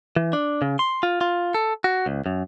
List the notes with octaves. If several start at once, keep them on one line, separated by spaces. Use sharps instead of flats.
E3
D4
C#3
C6
F4
F4
A4
F#4
C#2
F#2